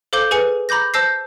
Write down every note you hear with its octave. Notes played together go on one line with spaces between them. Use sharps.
A4 C5 F5 D6 G6 G7
G#4 B4 G#5 C#7
A#5 B5 D6 G6 A#6
C5 A5 E6 G6 A#6 C7